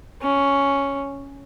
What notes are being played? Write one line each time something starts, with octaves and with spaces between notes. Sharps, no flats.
C#4